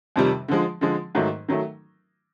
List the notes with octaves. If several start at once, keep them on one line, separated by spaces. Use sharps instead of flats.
F2 C3 D#3 G3
D3 F3 G#3
D3 F3 G#3
G#2 D#3 F#3 A3
D#3 F#3 A3